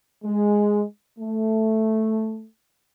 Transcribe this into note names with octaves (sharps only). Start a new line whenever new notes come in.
G#3
A3